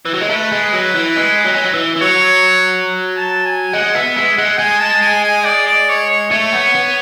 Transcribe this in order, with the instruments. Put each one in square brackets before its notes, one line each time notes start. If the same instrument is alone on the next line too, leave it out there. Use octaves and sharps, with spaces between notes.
[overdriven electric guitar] E3
F#3
G#3
[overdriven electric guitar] A3 [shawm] B4
[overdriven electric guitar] G#3
F#3
E3
G#3
F#3
G#3
F#3
E3
E3
[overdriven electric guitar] F#3 [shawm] C#5
[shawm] A5
G#5
[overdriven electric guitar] G#3 [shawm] F#5
[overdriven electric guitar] B3 [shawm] E5
[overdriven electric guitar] G#3 [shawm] E5
[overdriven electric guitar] G#3 [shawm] F#5
[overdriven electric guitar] G#3 [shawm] G#5
[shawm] A5
G#5
G#5
D5
D5
C#5
C#5
[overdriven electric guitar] A3 [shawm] C#5
[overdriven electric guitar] B3
B3